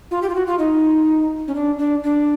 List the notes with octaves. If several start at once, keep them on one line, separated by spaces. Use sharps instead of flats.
F4
G4
F4
F#4
F4
D#4
C#4
D4
D4
D4